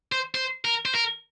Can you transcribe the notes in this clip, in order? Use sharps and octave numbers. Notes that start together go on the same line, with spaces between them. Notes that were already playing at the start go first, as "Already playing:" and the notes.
C5
C5
A#4
C5
A#4